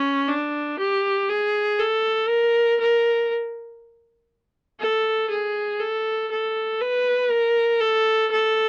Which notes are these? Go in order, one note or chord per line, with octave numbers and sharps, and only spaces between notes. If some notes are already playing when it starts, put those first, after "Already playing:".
Already playing: C#4
D4
G4
G#4
A4
A#4
A#4
A4
G#4
A4
A4
B4
A#4
A4
A4